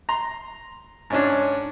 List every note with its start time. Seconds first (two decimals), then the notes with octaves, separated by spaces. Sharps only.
0.09 A#5 C6
1.10 G#2 C#4 D4